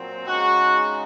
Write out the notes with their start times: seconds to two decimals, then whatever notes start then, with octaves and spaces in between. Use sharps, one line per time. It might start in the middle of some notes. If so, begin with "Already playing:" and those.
Already playing: A#2 F#3 C4
0.26 C#3 G#3 D#4 F#4